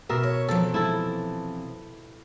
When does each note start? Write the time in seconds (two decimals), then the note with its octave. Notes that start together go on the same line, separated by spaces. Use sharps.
0.09 B2 A#4 E5
0.23 C#5
0.48 C3 E3 F3 A4
0.74 E4 A4